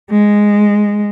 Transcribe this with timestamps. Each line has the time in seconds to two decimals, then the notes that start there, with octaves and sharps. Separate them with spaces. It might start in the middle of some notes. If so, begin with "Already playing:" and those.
0.10 G#3